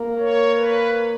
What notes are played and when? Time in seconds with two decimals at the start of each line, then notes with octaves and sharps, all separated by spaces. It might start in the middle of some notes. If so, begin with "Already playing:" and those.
Already playing: A#3
0.18 C#5
0.57 B4